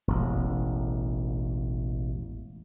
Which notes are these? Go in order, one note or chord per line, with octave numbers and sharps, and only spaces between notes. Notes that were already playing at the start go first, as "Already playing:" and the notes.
E1 A1